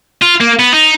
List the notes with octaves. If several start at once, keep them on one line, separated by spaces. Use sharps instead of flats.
F4
A#3
B3
D#4